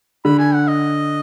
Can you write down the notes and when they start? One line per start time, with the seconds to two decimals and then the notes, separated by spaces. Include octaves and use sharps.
0.25 D3 B5
0.39 G#5
0.54 F#5
0.68 D#5